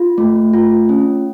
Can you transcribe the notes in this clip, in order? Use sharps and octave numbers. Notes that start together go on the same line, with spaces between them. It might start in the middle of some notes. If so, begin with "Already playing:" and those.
Already playing: F4
A3
F4
C#4